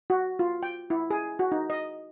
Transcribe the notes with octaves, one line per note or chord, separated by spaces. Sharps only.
F#4
F4
G5
E4
G#4
F#4
D#4
D#5